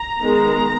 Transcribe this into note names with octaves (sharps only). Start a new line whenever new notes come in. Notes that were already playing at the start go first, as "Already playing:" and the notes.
Already playing: A#5
D#3 G#3 B3